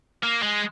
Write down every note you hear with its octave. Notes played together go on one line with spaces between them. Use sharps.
A#3
G#3